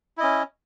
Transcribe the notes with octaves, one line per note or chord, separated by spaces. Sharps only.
C#4 E4 D#5